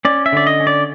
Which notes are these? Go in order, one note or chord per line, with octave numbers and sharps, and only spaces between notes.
C#4 D5
E5
D3 D5
D#5
C#4
D5